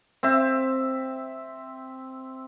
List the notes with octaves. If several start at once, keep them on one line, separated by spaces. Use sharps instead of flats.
C4 E5